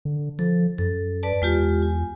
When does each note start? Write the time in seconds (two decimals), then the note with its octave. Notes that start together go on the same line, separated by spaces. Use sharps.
0.05 D3
0.39 F3 A4
0.78 F#2 A4
1.23 B4 D5 A5
1.42 E2 G#3 F4 G4
1.82 G#5